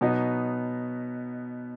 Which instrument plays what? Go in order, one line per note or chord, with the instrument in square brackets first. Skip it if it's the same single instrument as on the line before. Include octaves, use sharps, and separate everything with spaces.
[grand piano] B2 F#3 B3 D#4